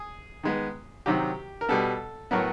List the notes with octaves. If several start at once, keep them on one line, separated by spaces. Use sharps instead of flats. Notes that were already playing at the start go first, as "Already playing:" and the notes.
Already playing: G#4
D#3 G#3 B3
C3 D#3 F#3 G4
A#4
B2 G3 B3 A4
A2 F#3 B3 A#4